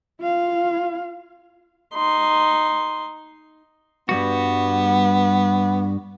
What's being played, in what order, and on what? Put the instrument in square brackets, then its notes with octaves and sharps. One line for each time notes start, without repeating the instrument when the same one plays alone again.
[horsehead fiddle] F4 F5
[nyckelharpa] D#4 C6
[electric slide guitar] G2 G3 F#4 [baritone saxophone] B3